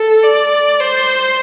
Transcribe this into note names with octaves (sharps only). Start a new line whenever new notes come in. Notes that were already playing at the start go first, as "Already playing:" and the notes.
Already playing: A4
D5
C5